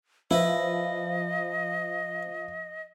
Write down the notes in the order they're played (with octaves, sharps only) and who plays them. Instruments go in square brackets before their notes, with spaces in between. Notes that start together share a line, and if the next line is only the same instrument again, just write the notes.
[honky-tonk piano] F3 [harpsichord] E4 B4 [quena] D#5